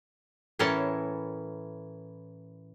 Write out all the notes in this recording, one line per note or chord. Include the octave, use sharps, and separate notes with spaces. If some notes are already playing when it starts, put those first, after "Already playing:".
A2 E3 C#4 A4 A#4 A5